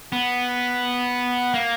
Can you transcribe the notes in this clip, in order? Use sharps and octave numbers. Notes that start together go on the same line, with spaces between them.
B3
A#3